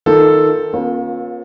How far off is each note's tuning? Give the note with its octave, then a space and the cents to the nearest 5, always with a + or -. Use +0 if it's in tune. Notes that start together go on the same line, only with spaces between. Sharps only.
D#3 +10 F4 +0 A4 +0
A#3 +45 C#4 -25 F4 +25